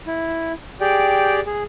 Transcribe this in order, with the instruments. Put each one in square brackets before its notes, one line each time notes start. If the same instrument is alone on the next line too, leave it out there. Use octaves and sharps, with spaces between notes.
[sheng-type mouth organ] E4
G4 G#4 D5 G5
G#4